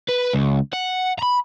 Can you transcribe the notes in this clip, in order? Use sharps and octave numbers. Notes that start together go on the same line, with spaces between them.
B4
C#2
F#5
A#5 B5